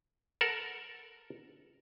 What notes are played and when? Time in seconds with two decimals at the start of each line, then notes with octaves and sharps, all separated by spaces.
0.41 A4 A#4 F#5